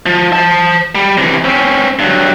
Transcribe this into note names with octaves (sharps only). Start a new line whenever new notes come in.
F3
C5 A5
G3
C3 E3
C4 C#4
G2 F#3